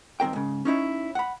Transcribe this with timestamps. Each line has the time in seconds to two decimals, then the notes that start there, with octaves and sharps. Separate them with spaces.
0.20 G2 D#3 C4 A#4 G5
0.33 G#2 C#3
0.65 C#4 D#4 E4 C#5
1.15 F#5 B5